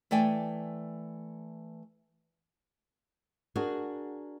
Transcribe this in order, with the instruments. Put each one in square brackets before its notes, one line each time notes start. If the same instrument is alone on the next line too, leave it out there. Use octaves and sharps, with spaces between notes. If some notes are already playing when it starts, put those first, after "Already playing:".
[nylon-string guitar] E3 A3 D5 G5 G#5
D4 F#4 G#4 A#4